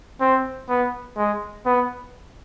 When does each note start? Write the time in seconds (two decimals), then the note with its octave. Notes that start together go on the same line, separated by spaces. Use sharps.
0.20 C4
0.69 B3
1.17 G#3
1.66 B3